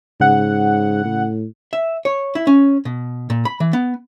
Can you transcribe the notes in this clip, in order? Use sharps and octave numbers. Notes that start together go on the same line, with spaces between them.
G#2 C#3 F#5
A2
E5
C#5
E4
C#4
B2
A#2
B5
E3
B3